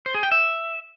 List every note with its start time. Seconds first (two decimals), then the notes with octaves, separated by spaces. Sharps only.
0.06 C5
0.14 G#4
0.23 G5
0.32 E5